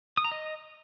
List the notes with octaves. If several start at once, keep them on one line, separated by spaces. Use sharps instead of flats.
D#6
A#5
D#5